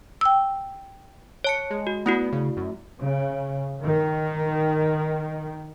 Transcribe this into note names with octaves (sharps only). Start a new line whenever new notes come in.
G5 E6
C#5 A5 C#7
G#3
F#4
A3 B3 E4 F#4
C#3
F#2
C#3
D#3